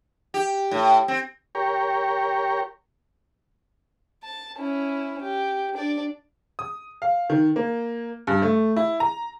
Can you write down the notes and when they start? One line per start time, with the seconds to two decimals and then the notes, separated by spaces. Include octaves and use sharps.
0.34 G4
0.71 A2
1.08 C4
1.55 G4 A#4 C#5
4.24 A5
4.58 C#4 E4
5.22 G4
5.75 D4 D5
6.59 D#6
7.02 F5
7.30 D#3
7.56 A#3
8.27 G2
8.42 A3
8.76 E4
9.00 A#5